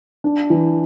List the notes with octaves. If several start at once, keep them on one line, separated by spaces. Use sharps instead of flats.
D4
E3